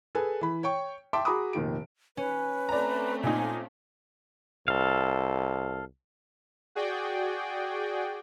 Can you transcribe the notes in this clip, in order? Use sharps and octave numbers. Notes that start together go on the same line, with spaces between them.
G#4 A4 B4 G#5 A5
E3 B5
C#5 G5 C#6
E5 G5 A5 C6 D6
F#4 G#4 A#5 B5 D6 D#6
F1 A#2 D#3 D7
C#4 B4
A3 C4 D5 A#5
A#2 D#4 G#5
C2 A4 F5
F#4 G#4 D5 G5